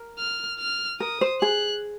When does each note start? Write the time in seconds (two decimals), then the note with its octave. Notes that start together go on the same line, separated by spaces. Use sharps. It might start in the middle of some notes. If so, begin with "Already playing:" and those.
Already playing: A#4
0.19 F6
0.60 F6
1.00 A#4 D#6
1.21 C5
1.42 G#4 F#6